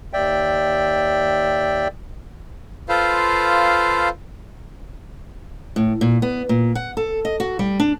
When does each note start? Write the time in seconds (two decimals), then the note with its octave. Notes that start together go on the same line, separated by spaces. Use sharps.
0.13 D#2 D5 E5 G5
2.89 F4 A4 B4 C5 F5
5.76 A2
6.01 A#2
6.22 B3
6.49 A#2
6.75 F#5
6.97 A4
7.25 D#5
7.40 F#4
7.59 G3
7.80 D4